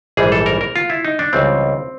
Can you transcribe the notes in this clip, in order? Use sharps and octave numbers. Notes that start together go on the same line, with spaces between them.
A#1 G#2 E3 G3 G#4
A4
A#4
A#4
F4
E4
D#4
D4
C#2 C#3 E3 G3 C4